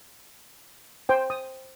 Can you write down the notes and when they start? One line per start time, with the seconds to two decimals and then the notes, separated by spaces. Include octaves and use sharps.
1.09 C5 G5
1.30 D#6